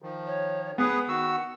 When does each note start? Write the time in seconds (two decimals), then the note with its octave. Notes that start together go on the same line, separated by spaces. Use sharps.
0.02 D#3 F3
0.26 C#5
0.78 B3 G#4 B4 D#6
1.08 D#3 F#4 F#5 E6